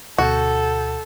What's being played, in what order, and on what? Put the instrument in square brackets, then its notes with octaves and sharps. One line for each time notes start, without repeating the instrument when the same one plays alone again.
[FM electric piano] D2 B2 G6 [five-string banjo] F#4 [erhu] A4